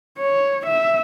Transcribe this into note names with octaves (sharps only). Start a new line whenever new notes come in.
C#5
E5